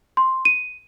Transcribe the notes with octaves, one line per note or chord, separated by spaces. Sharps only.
C6
D#7